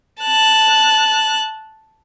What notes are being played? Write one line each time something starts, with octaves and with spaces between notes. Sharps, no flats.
A5 F#6